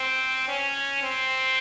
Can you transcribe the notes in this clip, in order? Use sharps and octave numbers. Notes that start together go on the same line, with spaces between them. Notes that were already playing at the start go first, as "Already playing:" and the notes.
Already playing: C4
C#4
C4